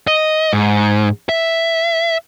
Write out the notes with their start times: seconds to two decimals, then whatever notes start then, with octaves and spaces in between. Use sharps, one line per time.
0.07 D#5
0.53 G#2
1.29 E5